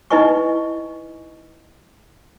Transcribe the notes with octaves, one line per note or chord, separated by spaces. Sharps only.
D#4 E4 B4 D#5 G#5 C#6